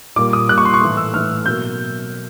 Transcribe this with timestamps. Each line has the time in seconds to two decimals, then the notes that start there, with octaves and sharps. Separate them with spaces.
0.16 A#2 G3 A#3 D6
0.33 D#6
0.49 A#2 G3 A#3 F#6
0.58 C#6
0.65 C6
0.74 C#6
0.81 A2 E3 A3
0.97 E6
1.13 A2 E3 A3 F6
1.46 B2 F#3 A#3 G6